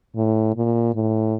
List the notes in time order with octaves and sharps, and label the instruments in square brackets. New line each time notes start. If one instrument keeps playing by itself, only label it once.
[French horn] A2
A#2
A2